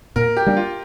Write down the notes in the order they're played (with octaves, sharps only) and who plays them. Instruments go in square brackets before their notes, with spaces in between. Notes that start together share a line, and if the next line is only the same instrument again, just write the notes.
[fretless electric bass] A#2 [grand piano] A#4
[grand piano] G4
[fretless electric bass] G3 A#3 D4
[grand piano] F4